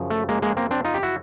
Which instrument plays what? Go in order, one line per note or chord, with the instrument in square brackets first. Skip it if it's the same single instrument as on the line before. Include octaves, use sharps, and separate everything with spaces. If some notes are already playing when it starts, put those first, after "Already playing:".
Already playing: [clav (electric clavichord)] F#2 C#3 F3
A3
G#3 A#3
G#3 A#3
A#3 C4
C4 D4
D#4 F4
G4
E4 F#4